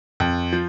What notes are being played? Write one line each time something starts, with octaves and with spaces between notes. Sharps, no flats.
F2
F3